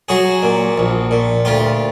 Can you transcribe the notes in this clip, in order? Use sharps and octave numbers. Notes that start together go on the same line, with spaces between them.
F#3 F#4 G#4
A#2
A#1
A#2
D2 F4 G4